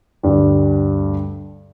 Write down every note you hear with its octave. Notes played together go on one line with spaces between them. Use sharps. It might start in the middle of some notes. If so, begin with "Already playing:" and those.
D2 G2 G3